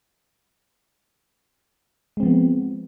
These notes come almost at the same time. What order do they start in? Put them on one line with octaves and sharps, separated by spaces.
G#3 C4 F3 B3